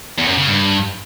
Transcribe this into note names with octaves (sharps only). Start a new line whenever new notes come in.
E2
F#2
C#3
G2